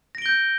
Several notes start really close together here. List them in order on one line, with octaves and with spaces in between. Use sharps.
A#6 D7 G7 G6